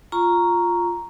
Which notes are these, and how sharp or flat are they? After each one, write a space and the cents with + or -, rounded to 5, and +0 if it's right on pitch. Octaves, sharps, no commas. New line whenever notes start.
F4 +0 A#5 +0 C#6 +0